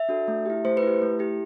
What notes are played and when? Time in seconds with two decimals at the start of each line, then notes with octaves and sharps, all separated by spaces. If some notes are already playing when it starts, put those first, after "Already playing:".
Already playing: E5
0.09 D4 F#4 A4
0.28 A3
0.46 E4 G4
0.65 A3 C5
0.77 B4
0.83 E4 G4
1.02 A3
1.19 E4 G4